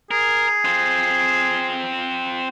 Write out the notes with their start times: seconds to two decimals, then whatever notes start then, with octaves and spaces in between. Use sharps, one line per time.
0.11 G#4 A#4
0.65 C4 F4